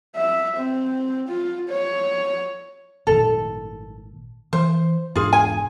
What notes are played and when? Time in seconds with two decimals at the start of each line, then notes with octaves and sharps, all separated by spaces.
0.16 E5
0.57 C4
1.28 F4
1.69 C#5
3.07 G#1 A#2 D#3 A4
4.53 E3 C5
5.15 E1 G#2 D4 F4 G#4
5.33 G#5